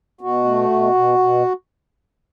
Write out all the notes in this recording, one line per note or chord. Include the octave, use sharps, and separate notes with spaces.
B2 F#4
A3
B2
B2
B2